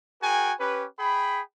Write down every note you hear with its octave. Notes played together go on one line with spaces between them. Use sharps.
F#4 G#4 A#4 G5 G#5
C#4 G4 B4
G#4 G5 B5